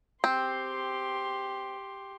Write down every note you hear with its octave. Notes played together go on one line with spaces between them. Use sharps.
C4 G4 C6